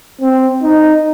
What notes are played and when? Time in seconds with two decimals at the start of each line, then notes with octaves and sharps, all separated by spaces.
0.21 C4
0.63 D#4